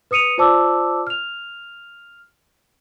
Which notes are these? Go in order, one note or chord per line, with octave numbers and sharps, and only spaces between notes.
B4 D#6 C#7 D#7 F7
F4 C5 D5 A5 D6 E6
F6 F7